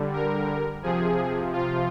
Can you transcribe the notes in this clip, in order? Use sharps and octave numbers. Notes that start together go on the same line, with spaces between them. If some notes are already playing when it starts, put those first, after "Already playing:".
Already playing: D3 G3
A#4
C3 F3 G#4
F4